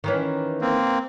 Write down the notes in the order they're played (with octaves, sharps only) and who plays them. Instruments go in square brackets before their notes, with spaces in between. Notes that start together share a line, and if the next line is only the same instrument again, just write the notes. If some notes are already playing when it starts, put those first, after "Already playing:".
[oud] D#3 E3 C#4
[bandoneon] A#3 C4